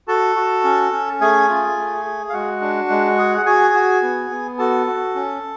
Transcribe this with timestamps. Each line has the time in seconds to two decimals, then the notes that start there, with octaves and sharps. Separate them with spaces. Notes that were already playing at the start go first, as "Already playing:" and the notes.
0.08 F#4 A4 A5
0.36 F#4
0.64 C#4
0.92 C#4
1.21 A3 G#4 G#5
1.49 F4
1.77 A3
2.05 G#4
2.29 F5
2.33 G#3 F#4 F#5
2.62 D4
2.90 G#3
3.18 G#4
3.37 F#5
3.46 F#4 G#4 G#5
3.74 F#4
4.02 B3
4.31 B3
4.58 F#4 A4 A5
4.87 F#4
5.15 C#4